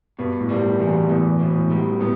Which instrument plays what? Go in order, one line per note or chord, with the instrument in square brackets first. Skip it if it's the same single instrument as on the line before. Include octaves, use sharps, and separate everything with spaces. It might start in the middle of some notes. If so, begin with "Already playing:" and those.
[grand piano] G2 [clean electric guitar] B2
[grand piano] A2
[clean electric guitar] G3
[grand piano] A2
[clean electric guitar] E2
[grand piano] B2
[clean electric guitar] E2 [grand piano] A2
[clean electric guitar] B2
[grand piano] A2
[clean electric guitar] G3
[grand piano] A2 [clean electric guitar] B3